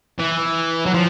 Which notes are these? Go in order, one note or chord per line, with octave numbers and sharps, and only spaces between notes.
E3
F#3
F3